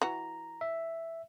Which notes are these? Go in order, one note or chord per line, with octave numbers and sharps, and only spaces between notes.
E3 F#4 A#5
E5